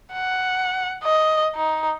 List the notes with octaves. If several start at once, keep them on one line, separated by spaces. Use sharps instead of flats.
F#5
D#5
D#4